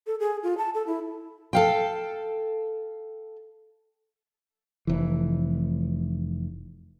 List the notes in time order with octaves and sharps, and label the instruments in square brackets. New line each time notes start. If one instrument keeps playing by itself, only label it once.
[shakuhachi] A4
G#4
F4
A5
A4
E4
[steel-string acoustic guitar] A4 F5 G5
[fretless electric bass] F1 E3